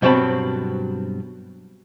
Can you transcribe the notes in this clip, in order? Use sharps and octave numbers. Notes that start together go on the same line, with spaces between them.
G2 B2 F#3 C4 A5 B5